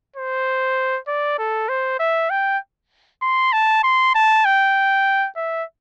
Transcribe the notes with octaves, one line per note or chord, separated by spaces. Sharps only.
C5
D5
A4
C5
E5
G5
C6
A5
C6
A5
G5
E5